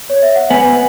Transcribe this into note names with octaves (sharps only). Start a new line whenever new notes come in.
C#5
E5
F#5
B3 G#5